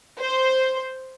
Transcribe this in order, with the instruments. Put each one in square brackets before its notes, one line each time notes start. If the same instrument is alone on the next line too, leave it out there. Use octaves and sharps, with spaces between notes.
[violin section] C5